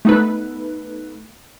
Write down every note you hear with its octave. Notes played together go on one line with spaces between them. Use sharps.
A3 B3 D#4 A4 B4